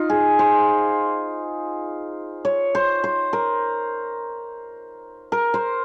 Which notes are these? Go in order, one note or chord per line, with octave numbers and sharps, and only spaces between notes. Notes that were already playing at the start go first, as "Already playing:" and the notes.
Already playing: D#4 F4
G#4
C5
C#5
C5
C5
A#4
A#4
C5